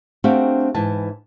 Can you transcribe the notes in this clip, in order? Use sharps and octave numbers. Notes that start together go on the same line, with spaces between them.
A3 C4 D4 F#4 G4 F5
G#2 E3 E4 A5